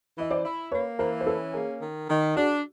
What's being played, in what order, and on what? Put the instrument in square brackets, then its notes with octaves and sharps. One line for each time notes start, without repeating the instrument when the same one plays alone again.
[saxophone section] E3 [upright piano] D#5
[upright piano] C5 D5
[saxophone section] E4
[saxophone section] A#3 [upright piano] B4 C#5
[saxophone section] E3 [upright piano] A#4 C5
[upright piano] C5
[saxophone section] C#4 [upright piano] A4 B4
[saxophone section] A#3 [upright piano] G#4 A#4
[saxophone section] D#3
D#3
[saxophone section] D4 [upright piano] F#4 G#4